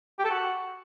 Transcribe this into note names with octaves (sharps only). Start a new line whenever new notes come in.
G4
A4
F#4